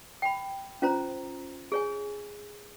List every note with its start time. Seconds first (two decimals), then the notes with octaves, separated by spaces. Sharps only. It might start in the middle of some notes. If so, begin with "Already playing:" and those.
0.22 G5 B5
0.82 C#4 F4 C5 A#5
1.72 G#4 C#5 G#5